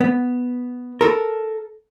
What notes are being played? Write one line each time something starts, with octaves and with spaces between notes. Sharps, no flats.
B3
A4 A#4